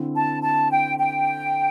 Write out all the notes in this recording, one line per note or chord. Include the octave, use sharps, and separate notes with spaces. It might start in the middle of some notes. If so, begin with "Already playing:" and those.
Already playing: D3 C4 E4
A5
A5
G5
G5